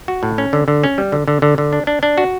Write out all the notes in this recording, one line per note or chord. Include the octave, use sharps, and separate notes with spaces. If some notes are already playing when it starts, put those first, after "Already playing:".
F#4
A2
C#4
D3
D3
C#4
G3
D3
D3
D3
D3
D4
D4
D4
F#4